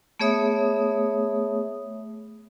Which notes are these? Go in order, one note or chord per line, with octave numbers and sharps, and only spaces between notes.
A3 B3 G#4 C#5 E5 D#6